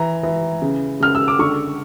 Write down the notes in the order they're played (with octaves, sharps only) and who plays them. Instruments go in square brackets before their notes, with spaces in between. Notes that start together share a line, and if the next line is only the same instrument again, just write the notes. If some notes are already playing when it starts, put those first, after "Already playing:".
Already playing: [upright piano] E3 A#5
E3
C#3
C#3 F6
E6
D6
D3 C#6